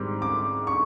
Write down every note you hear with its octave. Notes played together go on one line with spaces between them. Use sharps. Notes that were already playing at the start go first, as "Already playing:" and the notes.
Already playing: G#2 D#3 G3 C4 D6
D6
C#6